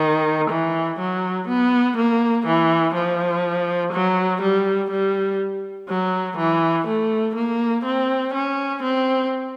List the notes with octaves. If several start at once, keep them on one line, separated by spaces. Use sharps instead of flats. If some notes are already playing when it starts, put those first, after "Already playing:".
Already playing: D#3
E3
F#3
B3
A#3
E3
F3
F#3
G3
G3
F#3
E3
A3
A#3
C4
C#4
C4